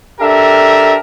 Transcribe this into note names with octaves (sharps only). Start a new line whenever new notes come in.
D4 G4 A4 A#4 E5